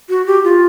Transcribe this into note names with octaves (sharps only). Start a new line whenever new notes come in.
F#4
G4
F4